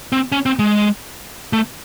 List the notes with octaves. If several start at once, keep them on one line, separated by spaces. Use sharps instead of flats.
C4
C#4
C4
G#3
A3